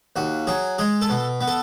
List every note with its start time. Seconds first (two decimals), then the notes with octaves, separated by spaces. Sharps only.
0.16 D#2 F#4
0.47 F#3 G#4
0.78 G#3 G#4
1.01 A4
1.10 B2
1.41 B3
1.48 A4